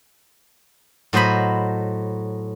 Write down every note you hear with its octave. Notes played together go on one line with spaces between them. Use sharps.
A2 F#3 C5 D#5 B5